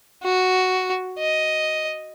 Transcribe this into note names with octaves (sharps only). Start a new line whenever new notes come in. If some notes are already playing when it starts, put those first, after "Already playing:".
F#4
D#5